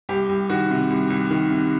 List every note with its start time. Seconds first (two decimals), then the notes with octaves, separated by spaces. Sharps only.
0.09 C2 G4
0.29 C2
0.49 D#3 F#4
0.70 C3
0.90 C2
1.10 C2
1.31 D#3
1.51 C3